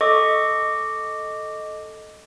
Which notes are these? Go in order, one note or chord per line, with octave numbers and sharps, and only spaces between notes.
A4 D#5 C#6 D6